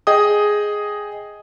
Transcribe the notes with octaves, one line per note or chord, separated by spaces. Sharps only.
G#4 D#5 G5 D#6